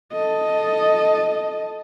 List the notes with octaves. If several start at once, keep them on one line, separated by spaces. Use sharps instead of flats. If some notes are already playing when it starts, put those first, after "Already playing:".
A4 D#5